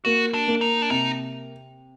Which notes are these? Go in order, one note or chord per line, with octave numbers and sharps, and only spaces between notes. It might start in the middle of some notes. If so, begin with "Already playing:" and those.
A#3 F#4
D4
A#3
D#4
D4
C3 D#4